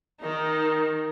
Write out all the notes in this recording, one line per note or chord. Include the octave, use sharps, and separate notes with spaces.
D#3 D#4